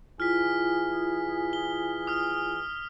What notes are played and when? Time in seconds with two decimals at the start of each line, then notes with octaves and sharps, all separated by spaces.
0.20 E3 E4 F4 G#4 F6 B6
1.53 G7
2.07 D#6 F6